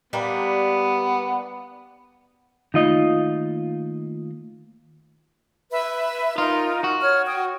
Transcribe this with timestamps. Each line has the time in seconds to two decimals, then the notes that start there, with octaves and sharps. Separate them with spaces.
0.13 G3 A#3 B3 D4
2.74 D#3 A3 A#3 D#4 F4 D#5
5.71 B4 E5
6.38 D#4 F4 A#4
6.84 F#4
7.01 C#5 F6
7.26 G5 D#6